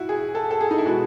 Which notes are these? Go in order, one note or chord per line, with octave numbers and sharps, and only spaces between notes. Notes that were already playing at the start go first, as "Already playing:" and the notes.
Already playing: E4 F#4
G#4
A4
A4
G#4
D#4
E4
B2 G#3 B3 F#4